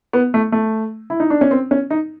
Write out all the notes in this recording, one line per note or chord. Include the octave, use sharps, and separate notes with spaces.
B3
A3
A3
E4
D#4
D4
C#4
C4
C#4
D#4